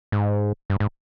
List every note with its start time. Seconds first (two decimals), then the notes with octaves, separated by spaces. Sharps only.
0.12 G#2
0.70 G2
0.80 G#2